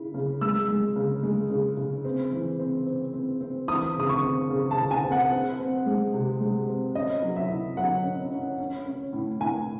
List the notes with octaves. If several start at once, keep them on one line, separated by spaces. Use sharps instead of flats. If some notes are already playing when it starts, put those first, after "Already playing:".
Already playing: C#3 E4
C#3
G#3 E6
G#3
C#3
G#3
C#3
C#3
C4
E3
C4
C4
C4
C4
E3 D#6
C#3 D#6
C#6
C4
C#3
A5
C#3
G#5
C4
F#5
C4
C4
G#3
C3
G#3
C4
C#4 D#5
F#3
E5
E4
F#3 F#5
C#4
C#4
C#4
C#4
A2
A2 G#5